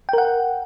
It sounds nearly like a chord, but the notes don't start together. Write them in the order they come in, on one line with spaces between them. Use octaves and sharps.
G5 A#4 F#5